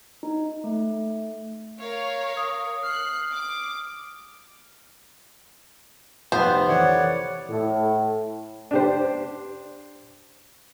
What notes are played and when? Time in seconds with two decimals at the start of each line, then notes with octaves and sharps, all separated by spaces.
0.23 D#4
0.64 A3
1.79 A#4 C#5 F5
2.37 D#6
2.83 F6 F#6 C7
3.32 D6
6.32 F1 B3 G4 C5 A6
6.68 E3 A4 C#5 D5 F#5
7.48 A2
8.71 D4 G4 C5